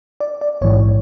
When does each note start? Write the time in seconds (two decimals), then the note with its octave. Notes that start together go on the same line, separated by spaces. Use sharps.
0.20 D5
0.41 D5
0.61 A#1 G#2 E3 C#5